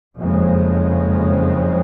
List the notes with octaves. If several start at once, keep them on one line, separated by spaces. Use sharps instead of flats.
F#1 F2 C#3 F3 G#3